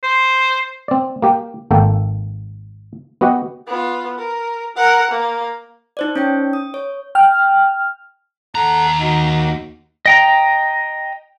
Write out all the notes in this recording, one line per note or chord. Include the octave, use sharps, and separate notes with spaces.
C5
C4 D5
A#3 G4 G5
G#1 A#3 A4 G5
B3 F#4 G4 D#5 F#5
B3 F4
A#4
A#4 F#5
A#3
D#4 C5 D5
C#4 D#4 C#5 G5
D#6
C#5
G5 F6
D#2 A4 F#5 A#5
D#3 D#4 F#4
D#5 G5 A#5